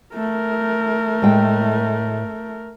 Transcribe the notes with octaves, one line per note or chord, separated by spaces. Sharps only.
A3 A#4
A2 G#3 G5